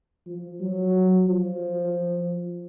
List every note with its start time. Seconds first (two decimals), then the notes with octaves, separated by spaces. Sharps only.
0.26 F3
0.60 F#3
1.27 F3